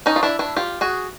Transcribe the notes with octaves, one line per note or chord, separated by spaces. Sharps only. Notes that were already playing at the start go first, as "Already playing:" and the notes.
C#4 D#4
F4
D4 E4
D4 E4
F4 G4
F#4 G#4